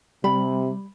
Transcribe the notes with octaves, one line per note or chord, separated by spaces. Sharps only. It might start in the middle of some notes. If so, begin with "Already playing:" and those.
C3 G3 B5